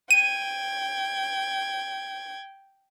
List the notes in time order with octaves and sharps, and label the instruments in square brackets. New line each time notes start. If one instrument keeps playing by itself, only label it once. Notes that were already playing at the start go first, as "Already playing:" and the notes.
[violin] G5 G#6 [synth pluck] D#7